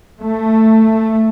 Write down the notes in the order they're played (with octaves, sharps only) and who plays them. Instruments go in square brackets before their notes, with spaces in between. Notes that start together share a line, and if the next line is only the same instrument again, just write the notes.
[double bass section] A3